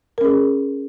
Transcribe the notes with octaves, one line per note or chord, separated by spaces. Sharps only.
C#4 G#4 A#4